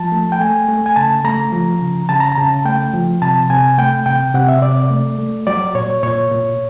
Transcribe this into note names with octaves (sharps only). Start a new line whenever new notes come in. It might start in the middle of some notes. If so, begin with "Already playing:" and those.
Already playing: F3 A5
A3
G5
A3 G#5
A3
G#5
C#3 A5
A3 A#5
F3
C#3
C#3 A5
A#5
A5
C#3
A3 G5
F3
C3 A5
C3 G#5
A3 G5
C3 G5
C3 F#5
E5
C3 D5
D5
A3
A3
F#3 D5
A#2 C#5
A#2 C#5
A#2